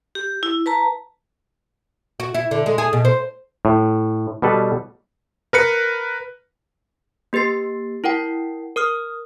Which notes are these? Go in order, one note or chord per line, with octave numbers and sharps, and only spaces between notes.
G4
E4
B4 A5 A#5
F#4
E4
D3
G#3
G#4
B2
C5
A2
B2 G3 A4 B4
A#4 B4 C#7
A#3 G4 B4 A6 C7
E4 A#4 F#5 G5
A#4 D#6 F6